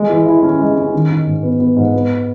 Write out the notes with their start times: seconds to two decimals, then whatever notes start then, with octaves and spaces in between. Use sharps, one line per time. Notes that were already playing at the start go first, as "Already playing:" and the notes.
Already playing: G#3
0.10 E3
0.26 E4
0.43 C#4
0.60 G#3
0.77 C#4
0.93 D#3
1.10 D#3
1.27 G#2
1.43 B3
1.59 B3
1.76 G#2
1.94 B3